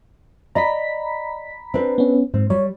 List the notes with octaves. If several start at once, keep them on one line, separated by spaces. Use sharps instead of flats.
D5 D#5 A#5 B5 B6
C4 D4 B4
B3 C#4
G#2 C4
G3 C#5